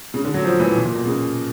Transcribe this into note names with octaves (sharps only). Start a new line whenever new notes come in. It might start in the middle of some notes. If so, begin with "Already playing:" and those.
C#3
D3
F#3
F3
E3
B2
A#2
B2
C#3